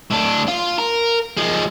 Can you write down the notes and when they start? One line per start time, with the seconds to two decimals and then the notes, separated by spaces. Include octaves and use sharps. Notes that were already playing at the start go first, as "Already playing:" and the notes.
0.10 A2 D4
0.48 F4
0.78 A#4
1.37 F3 G#3